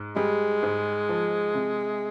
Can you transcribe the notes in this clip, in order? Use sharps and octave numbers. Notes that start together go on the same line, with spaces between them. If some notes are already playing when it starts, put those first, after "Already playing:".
Already playing: G#2
G3 G#3
G#2
F3
C3